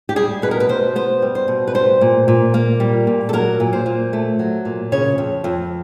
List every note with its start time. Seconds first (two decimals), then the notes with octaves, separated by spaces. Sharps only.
0.09 G4
0.16 G3 G#4
0.42 B2 B4
0.51 A#4
0.60 B4
0.69 B2 C5
0.96 B3 C5
1.22 G3
1.35 C5
1.48 B2
1.68 B4
1.74 G3 C5
2.01 A#2
2.28 A#2
2.54 A#3
2.80 G3
3.07 A#2
3.29 A4
3.33 F#3 A#4
3.60 A#2
3.73 C5
3.86 A#2
4.13 A3
4.39 F#3
4.65 A#2
4.92 C#3 C#5
5.18 F2
5.44 F2